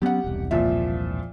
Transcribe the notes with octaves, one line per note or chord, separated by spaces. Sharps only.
F#3 B3 C#4 G4 F#5
E1 C2
A#2 F3 E5